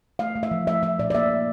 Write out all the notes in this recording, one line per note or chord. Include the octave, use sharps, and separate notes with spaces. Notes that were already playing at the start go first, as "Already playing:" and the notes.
A3 F5
A3
E5
F3
A3 E5
F3 E5
A#2 D5
D5
A#3 E5
A#3